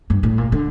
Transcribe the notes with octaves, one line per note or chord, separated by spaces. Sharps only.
G2
A2
A#2
D3